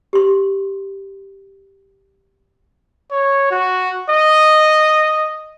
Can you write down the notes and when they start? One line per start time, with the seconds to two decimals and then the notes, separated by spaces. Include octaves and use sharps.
0.13 G4 C6
3.11 C#5
3.51 F#4
4.10 D#5